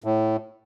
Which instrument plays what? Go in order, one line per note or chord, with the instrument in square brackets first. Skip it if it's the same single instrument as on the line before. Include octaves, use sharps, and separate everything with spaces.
[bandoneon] A2